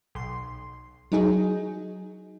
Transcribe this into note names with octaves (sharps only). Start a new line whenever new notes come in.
B1 C6
F#3 D#4 G#4